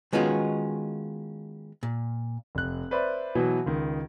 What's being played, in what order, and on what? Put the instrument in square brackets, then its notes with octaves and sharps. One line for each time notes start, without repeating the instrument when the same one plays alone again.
[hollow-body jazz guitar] D#3 G#3 B3 C#4 F4 F#4
A#2
[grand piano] F1 F#6
B4 C5 D5 E5 B5
B2 E3 F#3
C#2 D#3